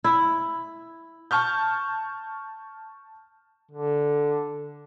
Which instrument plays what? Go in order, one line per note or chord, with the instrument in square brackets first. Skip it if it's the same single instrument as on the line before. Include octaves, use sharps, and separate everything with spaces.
[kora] E4
[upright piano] A5 C#6 F6 G6
[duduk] D3